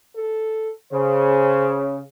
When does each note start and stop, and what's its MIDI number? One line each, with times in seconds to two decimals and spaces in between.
0.16 0.71 69
0.92 2.02 49
0.92 1.78 72